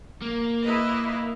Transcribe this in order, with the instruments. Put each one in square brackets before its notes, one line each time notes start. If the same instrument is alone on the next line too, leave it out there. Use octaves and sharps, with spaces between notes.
[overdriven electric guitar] A#3
[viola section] E4 B4 D#5